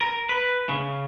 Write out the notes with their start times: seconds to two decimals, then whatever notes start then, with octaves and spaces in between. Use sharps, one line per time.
0.01 A#4
0.29 B4
0.69 C#3